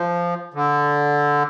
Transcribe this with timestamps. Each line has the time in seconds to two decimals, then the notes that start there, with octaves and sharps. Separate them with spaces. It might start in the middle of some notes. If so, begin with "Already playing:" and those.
Already playing: F3
0.54 D3